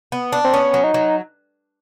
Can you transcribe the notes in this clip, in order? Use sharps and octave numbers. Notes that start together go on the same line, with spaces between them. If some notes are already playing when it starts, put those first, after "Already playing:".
B3
D4
C4
B3 C#4
F#3
D#4
F#3